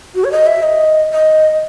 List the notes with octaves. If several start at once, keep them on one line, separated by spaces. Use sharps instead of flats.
F#4
C#5
D#5
E5
D#5
D#5